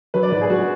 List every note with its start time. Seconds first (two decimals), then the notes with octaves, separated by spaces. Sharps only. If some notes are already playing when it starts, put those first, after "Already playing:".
0.14 F#3 B4
0.23 D5
0.31 G#2 B4
0.41 G#4
0.50 F#3 F#4
0.57 G#3